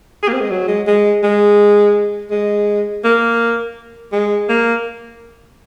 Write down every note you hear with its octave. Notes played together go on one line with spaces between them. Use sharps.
G#4
A#3
C4
G#3
F#3
G#3
G#3
G#3
G#3
A#3
G#3
A#3